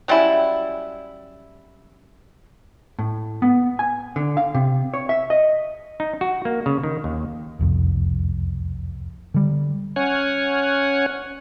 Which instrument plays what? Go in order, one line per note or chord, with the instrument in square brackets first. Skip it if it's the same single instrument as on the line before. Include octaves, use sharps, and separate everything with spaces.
[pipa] F#3 G3 C#4 E4
[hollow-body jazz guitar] A2
B3
G#5
D3
F5
C3
C#5
E5
D#5
[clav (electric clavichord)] D#4
F#4
A#3
C#3
D#3
D#2
[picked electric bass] E1 C2 F2
D3 G3
[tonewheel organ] C#4 C#5 F#5 G#5